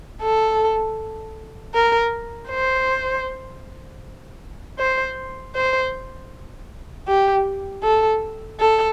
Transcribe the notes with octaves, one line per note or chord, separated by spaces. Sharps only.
A4
A#4
C5
C5
C5
G4
A4
A4